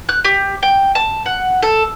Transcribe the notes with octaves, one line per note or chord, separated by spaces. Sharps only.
F#6
G4
G5
A5
F#5
A4